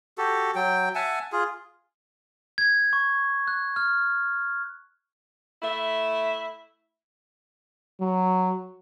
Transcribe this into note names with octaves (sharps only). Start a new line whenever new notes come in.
F#4 G4 A4
F#3 G5
E5 F#5 G#5 A5
F4 G#4
G#6
C#6
F#6
F6
A3 E4 E5
F#3